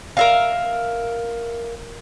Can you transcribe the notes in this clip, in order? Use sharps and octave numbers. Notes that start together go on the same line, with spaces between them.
A#4 E5 F5